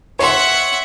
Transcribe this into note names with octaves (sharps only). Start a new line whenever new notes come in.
C#5 E5 F#5 C6